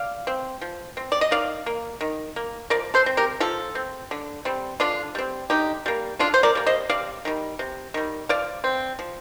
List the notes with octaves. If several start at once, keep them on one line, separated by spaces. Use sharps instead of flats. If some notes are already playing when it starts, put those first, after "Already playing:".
Already playing: D5 F5
C4
F3
C4
D5
D#5
D#3 D5 F5
A#3
D#3
A#3
F3 A#4 D5
A4 C5
C4
G4 A#4
F3 F4 A4
C4
D3
G3 C4
D3 D4 F4
G3 C4
D3 D#4 G4
G3 A#3
D3 D4 F4
C5
A#4 D5
G3 A#3
C5 D#5
C3 D5 F5
D#3 G3
C3
D#3 G3
F3 D5 F5
C4
F3